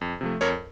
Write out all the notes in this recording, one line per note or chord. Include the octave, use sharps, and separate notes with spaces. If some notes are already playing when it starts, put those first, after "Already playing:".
F2
C3 F3 A3
F2 A#4 C#5